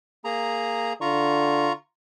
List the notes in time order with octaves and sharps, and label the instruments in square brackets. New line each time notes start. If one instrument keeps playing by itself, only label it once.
[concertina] A#3 G#4 A#5
[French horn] D3 [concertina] F4 A#5 C#6